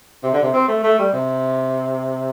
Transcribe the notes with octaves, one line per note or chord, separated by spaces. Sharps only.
C3
D3
C3
C4
A3
A3
G3
C3